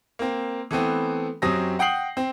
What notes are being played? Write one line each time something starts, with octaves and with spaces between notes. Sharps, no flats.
A#3 C4
E3 A3 B3 C4
F#2 F#3 C4 G4 D#6 A#6
F#5 G5 D#6 G6 C7 F#7
C4